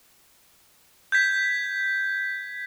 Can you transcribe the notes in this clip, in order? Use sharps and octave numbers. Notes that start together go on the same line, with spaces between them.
G6 G#6 B6